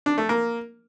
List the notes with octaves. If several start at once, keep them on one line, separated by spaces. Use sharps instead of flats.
D4
A3
A#3